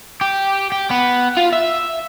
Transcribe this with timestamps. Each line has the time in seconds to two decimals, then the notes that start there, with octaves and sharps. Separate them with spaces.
0.21 G4
0.72 G4
0.91 B3
1.37 F4
1.53 E5